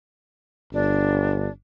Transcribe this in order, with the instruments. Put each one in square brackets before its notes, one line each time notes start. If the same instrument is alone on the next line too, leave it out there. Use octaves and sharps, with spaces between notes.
[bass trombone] G1 [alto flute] D4